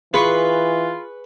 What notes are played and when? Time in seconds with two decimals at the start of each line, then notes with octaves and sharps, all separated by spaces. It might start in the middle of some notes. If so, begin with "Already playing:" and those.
0.14 E3 F4 G#4 B4 C#6